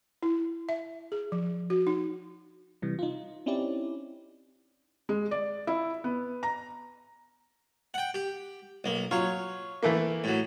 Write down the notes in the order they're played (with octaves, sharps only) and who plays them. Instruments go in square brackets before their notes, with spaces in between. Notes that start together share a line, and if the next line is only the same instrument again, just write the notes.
[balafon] E4
E5
G#4
F3
F#4
D#4
[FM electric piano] C3 E3 G3
D#4 F4
C4 C#4 D#4 E4 G4 D5
[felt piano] G#3
D5
E4
B3
A#5
[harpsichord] F#5 G5
G4
B1 A#3
[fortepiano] F#3 F4 [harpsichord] C#5
[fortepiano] E3 A3 A#3
[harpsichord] A2 F#3